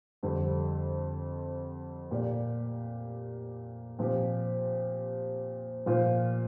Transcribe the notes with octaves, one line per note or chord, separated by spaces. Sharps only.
F2 D3 G3 C4
A#2 A#3 G4 D5
A#2 F3 C4 G4
A#2 F3 A#3 F4 C5